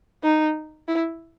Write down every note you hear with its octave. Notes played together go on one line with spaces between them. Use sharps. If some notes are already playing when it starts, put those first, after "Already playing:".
D#4
E4